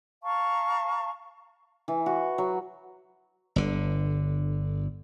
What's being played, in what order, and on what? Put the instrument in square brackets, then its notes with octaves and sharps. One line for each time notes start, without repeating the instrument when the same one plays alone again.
[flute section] F5 A5 A#5 C#6
[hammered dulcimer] E3
F#4
F#3
[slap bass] G1 D3